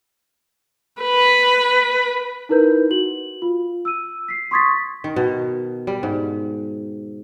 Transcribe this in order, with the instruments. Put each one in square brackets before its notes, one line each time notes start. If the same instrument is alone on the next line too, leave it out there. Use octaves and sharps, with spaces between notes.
[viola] B4
[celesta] D#4 E4 A#4 B4 G6
F#4 F#7
F4
E6 D#7
B6 C7
C6 C#6 D#6 G#6 A6 B6
[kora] D#3
B2
G3
G#2